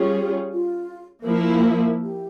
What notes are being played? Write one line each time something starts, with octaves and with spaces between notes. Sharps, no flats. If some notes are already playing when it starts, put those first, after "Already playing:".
Already playing: G3 C#4 F4 G4 G#4
F4
F3 A#3 E4 F4
G4